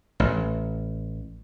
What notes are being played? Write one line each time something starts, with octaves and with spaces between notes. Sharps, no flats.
A1